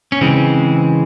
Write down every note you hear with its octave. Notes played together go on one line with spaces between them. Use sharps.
C#4
C#3 E3 G#3 C4